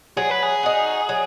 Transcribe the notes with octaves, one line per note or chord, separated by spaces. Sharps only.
F#3 G#4
B4
G#4
D#4 F#4
F#3